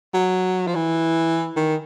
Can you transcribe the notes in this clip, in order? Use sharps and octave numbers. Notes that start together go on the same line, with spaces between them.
F#3
F3
E3
D#3